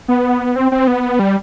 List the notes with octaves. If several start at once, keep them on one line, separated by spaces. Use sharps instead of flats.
B3
C4
C4
B3
G3